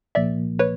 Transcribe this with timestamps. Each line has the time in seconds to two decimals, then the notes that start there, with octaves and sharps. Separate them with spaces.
0.15 C2 A#2 F3 A#3 D5 E5
0.59 B4 C#5